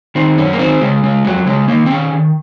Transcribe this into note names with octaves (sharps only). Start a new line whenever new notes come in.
D#3 C4
F#2 C#4
A#3
D#3 C4
C#3 G#3
C#3 G#3
F2 F#3
C#3 G#3
D#3 A#3
C4
D#3 C#4
D#3